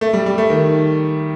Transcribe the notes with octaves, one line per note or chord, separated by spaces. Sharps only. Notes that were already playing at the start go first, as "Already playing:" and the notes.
A3
G3
G3
A3
D#3